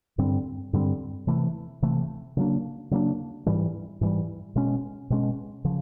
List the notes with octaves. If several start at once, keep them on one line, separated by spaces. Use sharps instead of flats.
G2 D3 G3 C4
G2 D3 G3 C4
C3 E3 A3
C3 E3 A3
C#3 F#3 A#3 D4
C#3 F#3 A#3 D4
G#2 E3 G3
G#2 E3 G3
B2 G#3 C#4
B2 G#3 C#4
C#3 F3